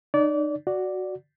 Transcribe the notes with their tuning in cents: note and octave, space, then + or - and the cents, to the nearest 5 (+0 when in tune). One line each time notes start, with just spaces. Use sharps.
D#4 -40 D5 -25
F#4 +0 D5 +0